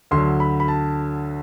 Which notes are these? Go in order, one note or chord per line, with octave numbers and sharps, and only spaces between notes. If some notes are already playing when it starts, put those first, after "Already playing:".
D2 D3 F#3 C6
B5
B5
A5